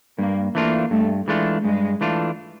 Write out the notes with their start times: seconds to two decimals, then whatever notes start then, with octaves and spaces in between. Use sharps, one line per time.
0.19 G2 A#3
0.55 E3 A3 A#3 D4 F4
0.91 G2 A3
1.28 E3 G#3 A3 D4 F4
1.64 G2 G#3
2.01 E3 A3 D4 F4